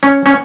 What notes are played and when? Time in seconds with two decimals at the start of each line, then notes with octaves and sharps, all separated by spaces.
0.03 C#4
0.26 C#4